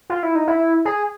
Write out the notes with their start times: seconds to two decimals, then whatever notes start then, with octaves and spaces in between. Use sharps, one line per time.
0.10 F4
0.23 E4
0.35 D#4
0.48 E4
0.85 G#4